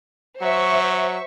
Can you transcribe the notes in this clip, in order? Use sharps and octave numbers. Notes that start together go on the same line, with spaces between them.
F#3 C5 E5 C#6